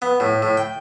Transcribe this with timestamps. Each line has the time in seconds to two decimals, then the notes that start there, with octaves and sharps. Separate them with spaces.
0.02 B3
0.20 A2
0.42 A2
0.57 G5